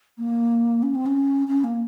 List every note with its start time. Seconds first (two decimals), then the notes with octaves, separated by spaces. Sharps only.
0.18 A#3
0.83 C#4
0.95 C4
1.06 C#4
1.48 C#4
1.64 A#3